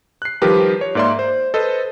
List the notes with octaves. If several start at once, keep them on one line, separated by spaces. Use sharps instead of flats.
F#6 C7
D#3 F3 G3 G4 A#4 B4
C#5
G#2 A#3 D5 E5 C6
C5
A4 B4 C5 D#5